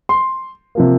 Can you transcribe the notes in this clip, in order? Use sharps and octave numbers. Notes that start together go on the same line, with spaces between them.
C6
C3 F3 A#3